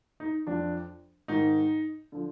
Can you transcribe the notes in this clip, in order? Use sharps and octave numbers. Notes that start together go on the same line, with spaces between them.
D#4
F2 F3 D4
G#2 D#3 D#4
D3 F3